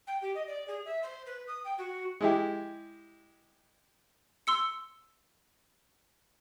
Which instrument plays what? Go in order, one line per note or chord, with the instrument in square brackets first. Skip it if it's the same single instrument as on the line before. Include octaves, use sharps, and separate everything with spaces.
[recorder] G5
G4
D#5
D5
G#4
E5
C5
B4
D#6
G5
F#4
[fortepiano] G#3 E4 G4
[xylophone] C6 E6 C#7